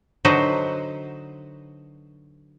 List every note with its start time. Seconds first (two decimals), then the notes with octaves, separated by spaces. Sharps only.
0.25 D3 F#3 D#4 F#4 B4 C5